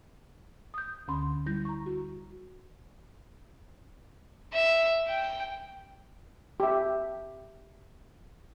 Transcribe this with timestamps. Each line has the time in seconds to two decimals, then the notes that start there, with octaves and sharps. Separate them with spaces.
0.74 D#6 G6
1.08 D2 D3 C#4 B5 C6
1.46 G3 E4 G6 A#6
1.65 A#5 C#6
1.86 F#4
4.53 E5
5.08 G5
6.60 G4 E5